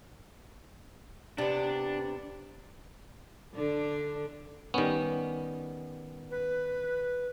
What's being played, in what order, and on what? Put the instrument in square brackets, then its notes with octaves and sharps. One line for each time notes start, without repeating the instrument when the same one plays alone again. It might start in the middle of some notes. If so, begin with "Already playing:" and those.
[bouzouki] C3 B3 [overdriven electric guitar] D4
[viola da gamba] D3 D4
[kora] D#3 C#4 [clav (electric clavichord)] G3 B3
[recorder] B4